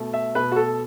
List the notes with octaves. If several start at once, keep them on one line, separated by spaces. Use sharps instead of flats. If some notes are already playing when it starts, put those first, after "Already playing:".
Already playing: B2 A3
E5
B2 B4
F#4
A4